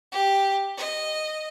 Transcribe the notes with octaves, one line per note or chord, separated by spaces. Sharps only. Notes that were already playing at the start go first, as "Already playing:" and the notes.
G4
D#5